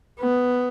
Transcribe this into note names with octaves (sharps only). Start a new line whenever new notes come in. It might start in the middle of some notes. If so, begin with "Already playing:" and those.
B3